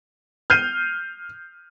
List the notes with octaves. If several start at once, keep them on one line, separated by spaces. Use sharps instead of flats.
F6 G6 C7 D#7